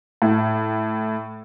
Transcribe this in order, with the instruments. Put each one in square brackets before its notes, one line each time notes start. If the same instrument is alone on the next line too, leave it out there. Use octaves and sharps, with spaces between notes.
[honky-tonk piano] A2